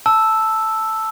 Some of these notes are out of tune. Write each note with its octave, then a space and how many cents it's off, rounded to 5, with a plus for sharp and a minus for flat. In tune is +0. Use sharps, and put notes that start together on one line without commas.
A5 +0 E6 +0